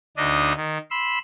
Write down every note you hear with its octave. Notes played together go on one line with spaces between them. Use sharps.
D2 D4 D#4 D#5
D#3
B5 C6 E6